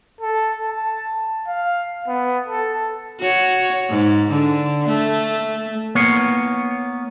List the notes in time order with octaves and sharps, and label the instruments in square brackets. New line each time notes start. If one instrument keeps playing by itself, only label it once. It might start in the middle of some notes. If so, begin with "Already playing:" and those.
[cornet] A4
A5
F5
B3
A4
[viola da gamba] F#4 C#5
G#2
D3
A3
[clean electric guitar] A#3 B3 C#5